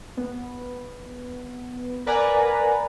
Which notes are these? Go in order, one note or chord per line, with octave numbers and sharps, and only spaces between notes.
B3
A#4 B4 D5 F#5 G#5 A#5